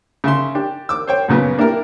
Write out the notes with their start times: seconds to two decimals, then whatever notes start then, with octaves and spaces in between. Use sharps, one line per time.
0.24 C#3 E5 C6
0.55 D4 G4
0.89 D6 E6
1.07 C5 C#5 G5
1.28 F#2 A#2 C#3 B3
1.58 A#3 D4 E4 G4 A#4